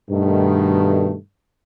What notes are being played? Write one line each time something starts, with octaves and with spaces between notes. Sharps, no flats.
G2 B2 D#3 A3